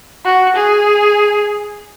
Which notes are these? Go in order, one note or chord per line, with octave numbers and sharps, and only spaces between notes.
F#4
G#4